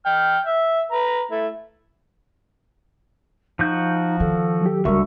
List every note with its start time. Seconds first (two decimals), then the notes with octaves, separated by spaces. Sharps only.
0.06 G5 F6
0.46 E5
0.91 B4 A#5
1.31 A3 E4
3.59 F3 D#4 F#4 G6
4.20 D#3 A4
4.62 F#3 G4
4.85 C#2 D3 G3 F#4 A#4 E5 C#6